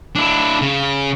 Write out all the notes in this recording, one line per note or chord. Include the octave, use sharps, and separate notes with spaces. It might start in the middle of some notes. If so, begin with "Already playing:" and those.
D4 E4
C#3